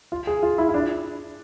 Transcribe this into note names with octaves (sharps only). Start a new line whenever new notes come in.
F4
G#4
F4
E4
E4
D4